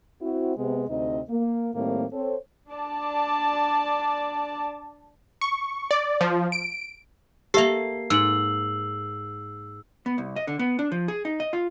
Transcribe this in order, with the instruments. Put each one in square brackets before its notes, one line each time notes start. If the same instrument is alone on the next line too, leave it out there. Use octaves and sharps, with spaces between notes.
[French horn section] C4 E4 F#4
C3 G#3 B3
D2 C3 C4 D#4 D#5
A#3
A2 D#3 G3 A#3 C4
C4 A4 C#5
[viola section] D4 D5 A5
[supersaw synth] C#6
D5
F3
D7
[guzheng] A#3 A4 [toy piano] G4 E5 [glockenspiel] C7
[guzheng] G#2 [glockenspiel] E6 F#7
[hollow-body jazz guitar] B3
C2
D#5
D3
B3
D4
F3
G#4
D#4
D#5
F4